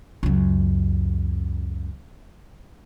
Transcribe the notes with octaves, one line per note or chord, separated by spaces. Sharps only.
C#2 F#2